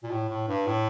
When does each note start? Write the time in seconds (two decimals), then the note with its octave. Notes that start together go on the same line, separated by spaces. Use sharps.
0.04 A#2
0.11 A2
0.29 A2
0.48 G2
0.67 A2